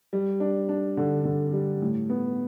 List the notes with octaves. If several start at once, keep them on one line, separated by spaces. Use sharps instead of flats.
G3
D4
D4
D3
D3
G3
A2
B3